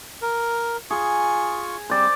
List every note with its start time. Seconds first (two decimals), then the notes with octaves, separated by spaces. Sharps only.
0.22 A#4
0.90 F4 G#4 C#6
1.90 G3 C4 C5 D5